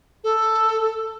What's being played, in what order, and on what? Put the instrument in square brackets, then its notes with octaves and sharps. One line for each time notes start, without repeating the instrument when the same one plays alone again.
[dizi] A4